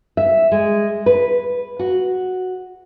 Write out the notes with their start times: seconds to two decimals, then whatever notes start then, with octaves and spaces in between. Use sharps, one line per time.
0.17 E5
0.52 G#3
1.06 B4
1.79 F#4